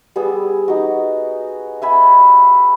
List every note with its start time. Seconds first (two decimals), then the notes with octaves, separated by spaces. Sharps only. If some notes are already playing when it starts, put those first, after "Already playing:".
0.16 G3 B3 G#4 E6
0.68 D#4 F#4
1.82 E5 G#5 B5